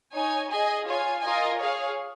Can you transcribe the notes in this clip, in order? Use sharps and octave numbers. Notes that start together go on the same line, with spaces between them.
D#4 C#5 G#5
G#4 D#5 G#5
F4 C#5 G#5
F4 A#4 D#5 G#5
G#4 C#5 F5